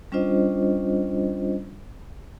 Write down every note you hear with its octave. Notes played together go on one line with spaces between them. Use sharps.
G3 C#4 D4 F4 C5 D#5